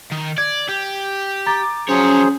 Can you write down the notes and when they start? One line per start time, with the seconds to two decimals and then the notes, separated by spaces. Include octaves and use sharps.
0.11 D#3
0.38 D5 G#6
0.69 G4
1.46 A#5 D6 A6
1.89 F3 F#3 C#4 G#4 C5 C#5